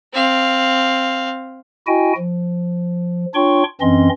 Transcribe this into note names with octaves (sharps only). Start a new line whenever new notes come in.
C4 F5
E4 F#4 D#5 G5 G#5
F3
D4 F4 C#5 G5 C6 C#6
F#2 E3 C4 C#4 D#5 C6